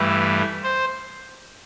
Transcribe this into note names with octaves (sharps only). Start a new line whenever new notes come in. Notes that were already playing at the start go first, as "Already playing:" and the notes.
Already playing: G2 E3 A3
C5